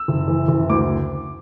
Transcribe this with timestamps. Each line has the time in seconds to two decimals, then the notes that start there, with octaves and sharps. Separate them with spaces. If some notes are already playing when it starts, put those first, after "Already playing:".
Already playing: E6
0.08 F#1
0.28 E3
0.48 F#1
0.70 D2 D6